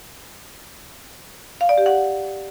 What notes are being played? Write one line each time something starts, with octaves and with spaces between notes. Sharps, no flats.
F5
D5
G4
F#5